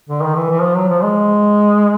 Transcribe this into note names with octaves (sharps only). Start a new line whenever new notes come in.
D3
D#3
E3
E3
F3
F#3
F3
G#3